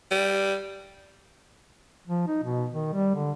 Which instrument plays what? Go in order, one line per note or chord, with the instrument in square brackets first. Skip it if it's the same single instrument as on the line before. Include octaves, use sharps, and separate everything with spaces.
[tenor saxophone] G3
[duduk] F3
D#4
B2
D#3
G3
D3